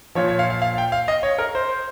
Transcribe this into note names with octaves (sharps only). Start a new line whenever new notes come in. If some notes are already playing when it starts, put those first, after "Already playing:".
A#2 F3 C#5
C#5
F5
F5
F5
G5
F5
D#5
C#5
A#4
C5